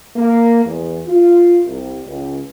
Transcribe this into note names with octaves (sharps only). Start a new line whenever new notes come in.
A#3
E2
F4
C2
C#2